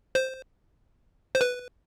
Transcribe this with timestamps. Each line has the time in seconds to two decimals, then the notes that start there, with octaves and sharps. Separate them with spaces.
0.15 C5
1.35 C5
1.41 B4